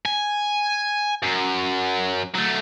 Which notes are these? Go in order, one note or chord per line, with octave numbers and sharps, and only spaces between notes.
G#5
F#2
F#3 A3